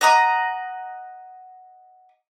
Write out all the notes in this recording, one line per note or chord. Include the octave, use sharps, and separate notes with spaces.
D#5 F#5 A#5 D#6